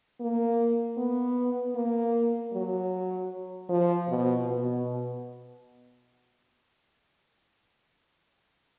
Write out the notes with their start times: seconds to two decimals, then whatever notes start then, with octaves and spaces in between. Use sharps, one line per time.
0.20 A#3
0.97 B3
1.75 A#3
2.53 F#3
3.69 F3
4.09 B2
4.47 B2